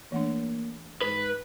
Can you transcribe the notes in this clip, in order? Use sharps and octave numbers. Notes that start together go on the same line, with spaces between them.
E3 A3 A#3 D4
G#2 B4